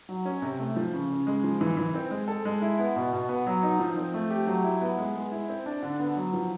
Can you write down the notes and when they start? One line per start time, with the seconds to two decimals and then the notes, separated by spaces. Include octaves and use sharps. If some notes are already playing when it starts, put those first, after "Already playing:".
0.09 F#3
0.25 C#4
0.42 C3
0.60 A3
0.76 F3
0.94 C#3
1.10 C#3
1.27 G#3
1.44 F3
1.61 E3
1.77 E3
1.94 C4
2.11 G#3
2.28 A4
2.45 G#3
2.62 E4
2.79 B3
2.96 B2
3.13 B2
3.29 B3
3.47 F#3
3.63 D#4
3.80 F3
3.97 C4
4.14 A3
4.30 G4
4.47 F#3
4.64 E4
4.81 B3
4.98 G#3
5.15 G#3
5.32 E4
5.49 C4
5.66 D4
5.83 D3
6.00 B3
6.16 F#3
6.33 F3